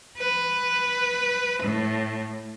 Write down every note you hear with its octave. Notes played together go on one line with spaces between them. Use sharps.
B4
A2